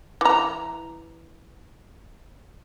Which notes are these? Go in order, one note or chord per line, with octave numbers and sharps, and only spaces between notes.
E3 A#5